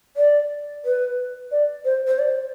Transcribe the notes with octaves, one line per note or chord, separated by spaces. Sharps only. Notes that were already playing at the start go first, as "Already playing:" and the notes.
D5
B4
D5
C5
C5
D5